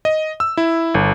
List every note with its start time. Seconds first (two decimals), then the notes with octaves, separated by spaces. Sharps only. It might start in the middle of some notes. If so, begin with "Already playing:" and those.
0.05 D#5
0.40 E6
0.57 E4
0.94 G1